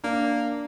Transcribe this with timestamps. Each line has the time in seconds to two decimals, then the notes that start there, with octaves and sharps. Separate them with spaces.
0.04 A#3 D4